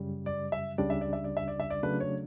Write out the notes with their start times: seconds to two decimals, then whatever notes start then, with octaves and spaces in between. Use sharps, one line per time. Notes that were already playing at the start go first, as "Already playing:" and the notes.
Already playing: F#2 C#3 G3
0.26 D5
0.52 E5
0.78 C#2 C#3 G3 D4 D5
0.90 E5
1.01 D5
1.13 E5
1.24 D5
1.37 E5
1.48 D5
1.60 E5
1.70 D5
1.83 C#3 F#3 A3 D4 B4
2.00 C#5